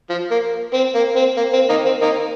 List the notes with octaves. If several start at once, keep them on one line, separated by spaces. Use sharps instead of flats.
F3
A#3
C4
A#3
C4
A#3
C4
A#3 D#4
C4
A#3 D#4